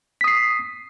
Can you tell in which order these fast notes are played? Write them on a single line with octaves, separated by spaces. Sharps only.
B6 D#6 C7